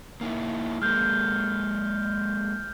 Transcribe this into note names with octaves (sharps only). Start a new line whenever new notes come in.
A#3 D#4 E4
G#3 A#3 F6 G6